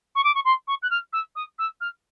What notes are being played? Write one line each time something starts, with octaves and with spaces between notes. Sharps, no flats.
C#6
D6
C#6
C6
C#6
F#6
F6
E6
D#6
E6
F6